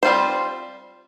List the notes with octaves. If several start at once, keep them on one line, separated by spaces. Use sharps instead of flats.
G3 C4 F4 C5